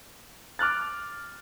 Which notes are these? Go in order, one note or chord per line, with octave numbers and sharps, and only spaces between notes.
D6 F6 F#6 A6